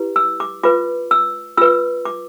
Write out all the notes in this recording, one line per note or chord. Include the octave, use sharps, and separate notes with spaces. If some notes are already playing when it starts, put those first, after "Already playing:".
Already playing: E4 G4 B4
E6
D6
F4 B4 D6
E6
F4 B4 E6
D6